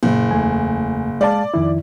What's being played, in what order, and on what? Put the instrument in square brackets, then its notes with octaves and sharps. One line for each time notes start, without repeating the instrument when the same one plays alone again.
[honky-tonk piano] F#1 [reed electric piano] A#2
[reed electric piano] E2 A3 G#5
[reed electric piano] G#3 F5 A5 [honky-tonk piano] D5
[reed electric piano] F2 D#3 E4